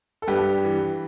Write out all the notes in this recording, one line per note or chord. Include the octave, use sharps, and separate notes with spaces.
A4
G2 G4 B4
E3